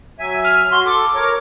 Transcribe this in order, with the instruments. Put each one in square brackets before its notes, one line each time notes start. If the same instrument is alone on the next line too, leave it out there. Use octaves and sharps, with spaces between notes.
[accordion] F#3 E5 G#5
[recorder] F6
[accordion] F#4 [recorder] C6
[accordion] A4 [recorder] D6
[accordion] A#4 C#5